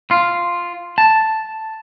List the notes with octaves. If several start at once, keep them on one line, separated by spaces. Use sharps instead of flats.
F4
A5